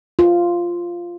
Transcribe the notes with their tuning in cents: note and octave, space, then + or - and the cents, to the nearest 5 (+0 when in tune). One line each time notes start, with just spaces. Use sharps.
F4 -5